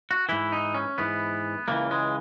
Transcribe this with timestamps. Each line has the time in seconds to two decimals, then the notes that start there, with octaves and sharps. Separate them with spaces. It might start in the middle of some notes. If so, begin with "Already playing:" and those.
0.11 F#4
0.29 G#2 E3 E4
0.52 D#4
0.75 C#4
0.98 G#2 E3 B3
1.68 C#2 C#3 E3 A#3
1.91 G#3